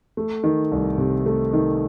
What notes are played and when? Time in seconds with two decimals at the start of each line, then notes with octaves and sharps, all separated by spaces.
0.17 A3
0.44 D#3
0.72 C2
0.98 C3
1.26 A3
1.53 D#3